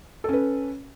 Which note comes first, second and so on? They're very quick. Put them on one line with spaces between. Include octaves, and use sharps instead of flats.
A4 C#4 B4